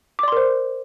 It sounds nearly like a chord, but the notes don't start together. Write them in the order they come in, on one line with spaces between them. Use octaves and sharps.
D6 D5 C6 A#4 C5